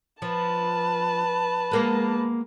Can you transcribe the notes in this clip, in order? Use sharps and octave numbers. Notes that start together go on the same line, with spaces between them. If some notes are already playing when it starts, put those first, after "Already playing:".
F3 B4 A5
G#3 A#3 B3